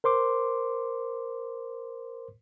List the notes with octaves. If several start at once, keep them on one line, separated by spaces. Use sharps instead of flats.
A#4 C5 C6 D6